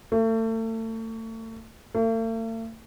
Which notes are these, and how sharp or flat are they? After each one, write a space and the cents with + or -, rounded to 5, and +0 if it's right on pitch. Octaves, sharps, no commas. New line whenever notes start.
A3 +35
A3 +45